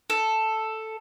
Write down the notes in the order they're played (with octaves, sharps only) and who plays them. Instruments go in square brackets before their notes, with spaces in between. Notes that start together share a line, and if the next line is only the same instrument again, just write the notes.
[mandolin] A4